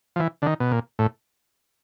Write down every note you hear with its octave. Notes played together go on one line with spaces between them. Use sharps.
F3
E3
D3
D#3
B2
A#2
A2